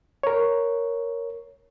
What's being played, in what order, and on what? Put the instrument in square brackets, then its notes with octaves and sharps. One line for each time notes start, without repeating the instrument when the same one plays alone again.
[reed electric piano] A#4 C#5